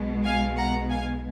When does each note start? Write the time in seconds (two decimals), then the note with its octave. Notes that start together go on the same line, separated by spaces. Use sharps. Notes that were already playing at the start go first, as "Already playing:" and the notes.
Already playing: B1 B2 G#3
0.24 F5 G#5
0.57 F#5 A#5
0.90 F5 G#5